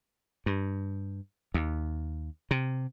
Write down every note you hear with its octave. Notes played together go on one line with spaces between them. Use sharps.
G2
D#2
C3